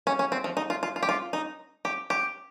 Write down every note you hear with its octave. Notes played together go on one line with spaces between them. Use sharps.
C#4
C#4
C4
F3
D#4
F4
F4
F4
G4
F4
D#4
G4
G4